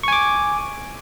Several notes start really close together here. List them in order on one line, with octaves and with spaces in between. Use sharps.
C#6 G#5 D6